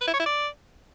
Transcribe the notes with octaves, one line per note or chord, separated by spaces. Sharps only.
B4
E4
C#5
E4
D5